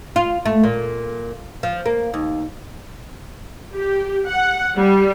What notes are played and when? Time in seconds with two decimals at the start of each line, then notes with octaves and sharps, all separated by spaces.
0.16 F4
0.45 A3
0.63 A#2
1.63 F3
1.86 A#3
2.14 D#2
3.75 G4
4.29 F#5
4.77 G3